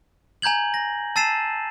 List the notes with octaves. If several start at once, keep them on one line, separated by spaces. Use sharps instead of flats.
G#5 A#5 G6 G#6 F#7
A#6
A5 E6 A6 C7 D#7 E7